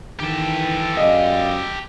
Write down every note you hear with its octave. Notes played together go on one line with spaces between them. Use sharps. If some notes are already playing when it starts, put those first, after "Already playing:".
D#3 E3 G4 A4
F#2 G#4 D5 D#5 F5